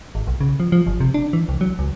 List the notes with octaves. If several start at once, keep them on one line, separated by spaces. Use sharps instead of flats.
G#1
B1
C#3
F3
F3
G1
C3
D4
E3
C2
F#3
C#2